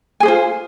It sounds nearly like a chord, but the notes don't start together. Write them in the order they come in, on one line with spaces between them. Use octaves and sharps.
G#5 G#4 C5 F4